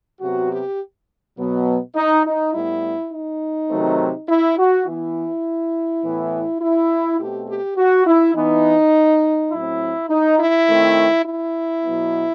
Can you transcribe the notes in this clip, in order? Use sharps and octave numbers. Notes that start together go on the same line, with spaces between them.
C3 F#3 B3 F#4
G4
B2 F#3 B3
D#4
D#4
A2 G3 B3 E4
D#4
C3 D#3 F#3 A3 C4
E4
F#4
E3 B3 E4
A2 E3 B3
E4
B2 A3 C4 G4
G4
F#4
E4
E3 B3 D#4
A2 F#3 C4 E4
D#4
E4
D#3 A3 C4
E4
B2 F#3 B3